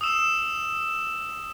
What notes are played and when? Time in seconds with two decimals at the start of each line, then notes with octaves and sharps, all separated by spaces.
0.01 D#6 E6 E7